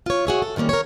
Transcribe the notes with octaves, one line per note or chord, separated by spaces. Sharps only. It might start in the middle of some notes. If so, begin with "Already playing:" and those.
F4 C#5
F#4 G#4 C#5 E5
A4
A2 D#3 G3 A#3 C#4
A#4 C#5